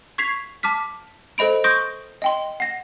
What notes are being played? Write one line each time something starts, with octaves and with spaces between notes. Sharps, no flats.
C#6 G#6 B6 C7 F7
A5 D6 F6 B6
A4 C5 D#5 B5 D7
C6 C#6 D#6 G6 A#6 D7
D#5 G5 C6
F#5 A#6